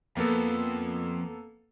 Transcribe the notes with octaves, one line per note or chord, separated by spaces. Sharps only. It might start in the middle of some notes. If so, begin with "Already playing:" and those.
F2 A#3 B3 A4